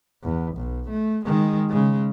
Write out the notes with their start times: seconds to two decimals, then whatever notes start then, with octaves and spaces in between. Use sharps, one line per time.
0.23 E2
0.56 B1
0.89 A3
1.25 D#3 G#3
1.69 C#3 G#3